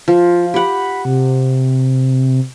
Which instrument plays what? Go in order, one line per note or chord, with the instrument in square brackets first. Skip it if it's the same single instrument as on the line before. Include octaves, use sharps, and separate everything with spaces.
[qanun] F3 [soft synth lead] F4
[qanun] G4 F#5 [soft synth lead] B5
[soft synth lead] C3